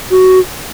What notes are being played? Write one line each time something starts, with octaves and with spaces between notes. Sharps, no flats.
F#4